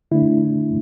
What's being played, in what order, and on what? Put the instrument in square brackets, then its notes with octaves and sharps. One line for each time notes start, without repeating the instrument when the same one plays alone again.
[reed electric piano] D3 A3 D4 E4